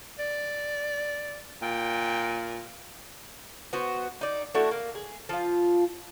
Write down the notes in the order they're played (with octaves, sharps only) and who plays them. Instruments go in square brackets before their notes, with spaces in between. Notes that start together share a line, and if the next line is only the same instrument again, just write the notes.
[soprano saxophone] D5
[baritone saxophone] A#2 [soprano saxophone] G5
[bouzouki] B3 F#4 C5
D#4 D5
A3 D4 E4 F#4
A#3
G#4
F3 F4